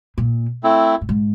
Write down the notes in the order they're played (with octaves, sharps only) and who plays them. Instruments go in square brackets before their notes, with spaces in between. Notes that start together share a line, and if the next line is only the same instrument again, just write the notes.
[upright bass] A#2
[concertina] A3 C4 E4
[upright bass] A2
G#2